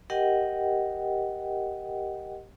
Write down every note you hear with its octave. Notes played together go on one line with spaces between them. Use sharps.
G4 A#4 D#5 F#5 G5